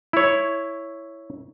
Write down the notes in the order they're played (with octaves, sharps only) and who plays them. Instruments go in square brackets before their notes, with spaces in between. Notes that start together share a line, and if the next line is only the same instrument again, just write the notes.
[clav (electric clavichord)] E4 C#5